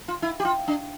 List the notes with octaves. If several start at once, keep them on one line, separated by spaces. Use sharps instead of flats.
F4
E4
G4
F4
D4